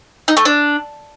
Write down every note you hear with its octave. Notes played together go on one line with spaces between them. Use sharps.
D#4
A3
D4